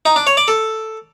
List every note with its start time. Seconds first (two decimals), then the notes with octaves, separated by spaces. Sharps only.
0.06 D#4
0.16 D4
0.27 C#5
0.37 D5
0.48 A4